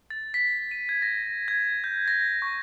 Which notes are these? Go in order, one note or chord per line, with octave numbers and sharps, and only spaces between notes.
A6
B6
D#7
G#6
A#6
G#6
G6
A#6
C#6